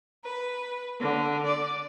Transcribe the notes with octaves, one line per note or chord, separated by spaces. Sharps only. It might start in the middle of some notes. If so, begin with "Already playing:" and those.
B4
D3
D5